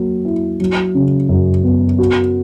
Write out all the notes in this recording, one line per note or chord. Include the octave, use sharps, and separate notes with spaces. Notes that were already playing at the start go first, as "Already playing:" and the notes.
Already playing: F#3 A#3
E4
F#3
C#3
F#2
B3
F#4